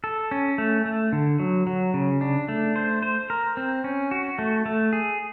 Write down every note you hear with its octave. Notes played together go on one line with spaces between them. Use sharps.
A4
C#4
A3
A3
D3
F#3
F#3
C#3
D4
A3
C5
C5
A#4
C4
C#4
F#4
A3
A3
G#4